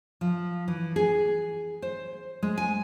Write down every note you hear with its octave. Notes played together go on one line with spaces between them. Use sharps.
F3
E3
G#4
C5
G#3
G#5